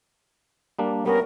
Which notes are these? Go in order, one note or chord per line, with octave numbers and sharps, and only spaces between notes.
G3 A#3 D4
G3 B3 C#4 A#4